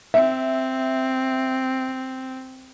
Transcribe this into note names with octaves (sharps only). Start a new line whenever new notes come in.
C4 E5